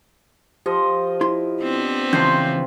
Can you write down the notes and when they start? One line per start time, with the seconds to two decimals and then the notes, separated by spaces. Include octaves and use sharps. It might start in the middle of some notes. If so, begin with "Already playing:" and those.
0.66 F3 G4 D#5
1.21 E4 C6
1.62 B3 C4 D4
2.13 C#2 C3 E3 F3 C#4 G6 C7